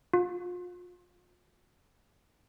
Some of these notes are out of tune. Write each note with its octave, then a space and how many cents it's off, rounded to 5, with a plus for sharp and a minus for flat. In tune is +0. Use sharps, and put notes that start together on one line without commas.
F4 +35